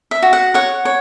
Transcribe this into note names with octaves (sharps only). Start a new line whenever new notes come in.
E5
F#4
F#5
C#5 F#5
C#5